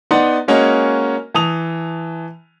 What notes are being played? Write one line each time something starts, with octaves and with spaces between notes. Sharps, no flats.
B3 D#4 D5 F#5 C6
G#3 A#3 C#4 F#4 C#5 D#5
E3 A5 D#6 F7